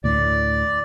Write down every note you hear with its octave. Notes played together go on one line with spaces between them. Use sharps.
D2 A2 D5